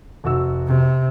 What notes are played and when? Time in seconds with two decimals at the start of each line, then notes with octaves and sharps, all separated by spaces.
0.24 F1 F#4 E6
0.67 C3